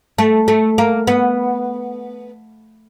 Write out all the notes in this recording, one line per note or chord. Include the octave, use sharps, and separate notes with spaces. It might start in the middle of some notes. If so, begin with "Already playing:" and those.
A3
A3
A#3
B3